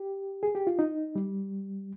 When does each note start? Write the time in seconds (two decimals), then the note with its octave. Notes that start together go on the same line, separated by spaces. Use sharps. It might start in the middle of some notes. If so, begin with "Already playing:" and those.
Already playing: G4
0.43 G#4
0.55 G4
0.67 F4
0.79 D#4
1.15 G3